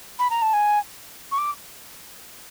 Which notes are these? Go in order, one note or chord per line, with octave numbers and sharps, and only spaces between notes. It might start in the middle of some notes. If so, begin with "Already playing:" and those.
B5
A#5
A5
G#5
C#6
D6